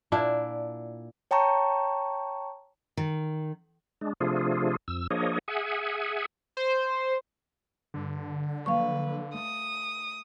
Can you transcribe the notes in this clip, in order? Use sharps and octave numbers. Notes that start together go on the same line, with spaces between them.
A#2 D4 E4 E5
C#5 G5 A5 A#5 C#6
D#3
G#3 D4
C3 F3 A3 D4 F4 G#4
F2 E6
F3 A#3 D4 G#4 C#5 D#5
G#4 E5 F#5 G#5
C5
G2 D3
F3 F#3 A#3 B4 F5 C#6
A3 D#6